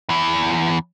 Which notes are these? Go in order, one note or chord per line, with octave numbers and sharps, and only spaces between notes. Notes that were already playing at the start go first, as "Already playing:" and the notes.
E2 E3